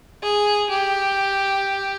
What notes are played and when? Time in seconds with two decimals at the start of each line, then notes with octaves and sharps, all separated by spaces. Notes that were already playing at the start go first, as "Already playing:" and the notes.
0.23 G#4
0.70 G4